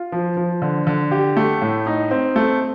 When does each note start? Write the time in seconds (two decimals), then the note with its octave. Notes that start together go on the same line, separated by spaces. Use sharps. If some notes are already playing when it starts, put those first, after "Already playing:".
Already playing: F4
0.12 F3
0.37 F3
0.62 D3
0.87 D3
1.11 G4
1.37 A3
1.61 A2
1.86 D#4
2.11 C4
2.36 A3